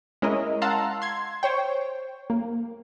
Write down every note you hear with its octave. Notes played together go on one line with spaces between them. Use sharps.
G#3 C#4 E4 A#4 D#5
F5 F#5 A5 A#5 C6 E6
C6 G#6
C5 C#5 G5
A#3